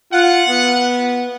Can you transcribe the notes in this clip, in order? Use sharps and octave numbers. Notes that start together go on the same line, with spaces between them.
F4 F#5
B3